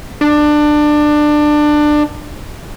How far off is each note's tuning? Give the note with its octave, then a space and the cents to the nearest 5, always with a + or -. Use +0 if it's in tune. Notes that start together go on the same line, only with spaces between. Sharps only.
D4 +20